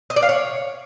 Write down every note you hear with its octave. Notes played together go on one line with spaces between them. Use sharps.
D#5
D5
F5
C#5